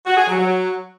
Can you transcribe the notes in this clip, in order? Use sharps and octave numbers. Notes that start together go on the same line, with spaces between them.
F#4
G#4
F#3
F#3